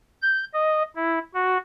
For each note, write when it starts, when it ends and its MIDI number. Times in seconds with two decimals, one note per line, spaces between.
0.22 0.44 91
0.54 0.83 75
0.96 1.19 64
1.34 1.58 66